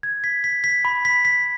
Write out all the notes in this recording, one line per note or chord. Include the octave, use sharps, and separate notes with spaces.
G#6
B6
B6
B6
B5
B6
B6